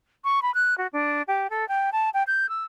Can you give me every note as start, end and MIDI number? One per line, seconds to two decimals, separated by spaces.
0.24 0.40 85
0.42 0.53 83
0.54 0.77 90
0.78 0.87 66
0.93 1.22 62
1.28 1.50 67
1.50 1.67 69
1.69 1.90 79
1.92 2.09 81
2.14 2.23 79
2.27 2.49 91
2.49 2.64 88